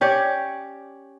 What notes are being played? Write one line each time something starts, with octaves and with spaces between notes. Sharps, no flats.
C#4 G4 C#5 D5